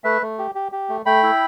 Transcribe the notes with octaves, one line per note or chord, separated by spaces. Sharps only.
A3 B4 E5
A3
G4
G4
G4
A3
A3 G5 B5
E4